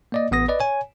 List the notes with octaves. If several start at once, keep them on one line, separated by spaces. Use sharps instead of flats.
A#3 D5 D#5
A1 B3 D#6 A#6
B4 D5 D#5
C#5 G#5